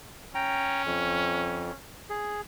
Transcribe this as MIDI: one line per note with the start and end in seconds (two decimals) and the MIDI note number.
0.35 1.77 61
0.35 0.82 79
0.35 0.82 82
0.85 1.71 41
2.10 2.41 68